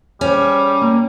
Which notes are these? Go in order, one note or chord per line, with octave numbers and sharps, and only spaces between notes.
G3 C#4 G#4 C5
A#3